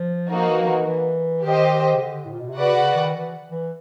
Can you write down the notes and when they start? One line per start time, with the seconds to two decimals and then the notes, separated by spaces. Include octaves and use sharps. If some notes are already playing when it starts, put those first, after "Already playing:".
Already playing: F3
0.30 F3 A#3 D#4 F#4 A#4
0.49 E3
0.61 F3
0.67 E3
0.86 E3
1.44 D#3 G4 C5 D#5
1.94 C#3
2.00 D3
2.25 A2
2.33 A#2
2.41 B2
2.49 C3
2.57 C#3 F#4 B4 D5 F#5
2.76 C#3
2.95 D#3
3.14 E3
3.51 E3